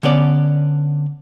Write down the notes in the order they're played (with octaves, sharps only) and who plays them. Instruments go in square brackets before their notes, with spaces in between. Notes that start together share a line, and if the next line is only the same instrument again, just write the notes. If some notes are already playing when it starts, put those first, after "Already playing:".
[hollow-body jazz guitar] D3 B3 C#4 D5